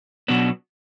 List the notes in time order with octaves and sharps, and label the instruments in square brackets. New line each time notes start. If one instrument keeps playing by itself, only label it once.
[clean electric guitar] B2 F#3 B3 D4